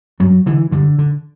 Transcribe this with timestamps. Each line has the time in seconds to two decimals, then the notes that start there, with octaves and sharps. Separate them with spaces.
0.20 G2 F#3
0.46 D3 E3
0.71 G2 D3
0.98 D3